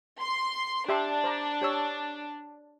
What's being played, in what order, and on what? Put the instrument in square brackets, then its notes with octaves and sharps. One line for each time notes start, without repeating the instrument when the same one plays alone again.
[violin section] C6
[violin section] D4 [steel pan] G4 E5 C6
[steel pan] C5 D5 A#5
G4 C#5 E6